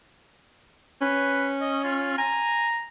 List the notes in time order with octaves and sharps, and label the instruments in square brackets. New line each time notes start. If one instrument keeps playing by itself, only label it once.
[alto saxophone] C#4 [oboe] B4
[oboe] D#5
F4
[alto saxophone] G#5 [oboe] A#5